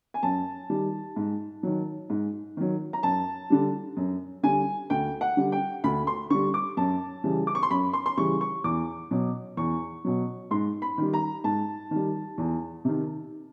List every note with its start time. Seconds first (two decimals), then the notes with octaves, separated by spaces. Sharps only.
0.14 G#5
0.23 F#2 A5
0.69 D#3 G3
1.16 G#2
1.63 D#3 F#3
2.10 G#2
2.57 D#3 F#3
2.93 A#5
3.03 F#2 A5
3.50 D3 G3
3.97 F#2
4.43 D3 G3 G#5
4.90 D2 G5
5.21 F#5
5.37 D3 G3
5.52 G5
5.84 D2 B5
6.07 C6
6.30 D3 G3 C#6
6.54 D6
6.77 F#2 A5
7.24 C#3 E3 G3
7.47 D6
7.55 C#6
7.63 C6
7.71 F#2 B5
7.93 C6
8.06 C6
8.17 C#3 E3 G3 C#6
8.41 C#6
8.64 E2 D6
9.11 B2 F#3
9.57 E2 C#6
10.05 B2 F#3
10.51 G#2 C6
10.82 B5
10.98 D#3 G3
11.14 A#5
11.44 G#2 A5
11.91 D#3 G3
12.38 E2
12.85 C3 D#3